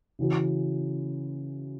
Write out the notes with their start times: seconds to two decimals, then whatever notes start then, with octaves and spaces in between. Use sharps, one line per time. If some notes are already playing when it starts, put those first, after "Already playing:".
0.19 C#3 E3 C#4 F#4